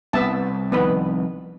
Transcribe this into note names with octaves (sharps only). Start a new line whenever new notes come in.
C2 B3 E5 A5
F2 D#3 B3 B4